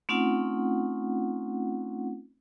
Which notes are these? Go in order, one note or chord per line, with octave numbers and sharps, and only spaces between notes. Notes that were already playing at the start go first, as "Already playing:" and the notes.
A3 C4 C#4 D#4 F4 F#5